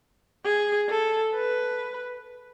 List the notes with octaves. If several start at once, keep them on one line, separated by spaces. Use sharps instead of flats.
G#4
A4
B4